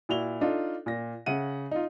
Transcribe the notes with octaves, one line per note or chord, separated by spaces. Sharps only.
A#2 E4 F#4 F7 G7
D4 D#4 F4 A4
A#2 A#6
C#3 E5 F#5 D#7
D#4 F4